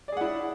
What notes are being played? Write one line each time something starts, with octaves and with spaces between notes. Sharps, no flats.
E4 G#4 D5 F#5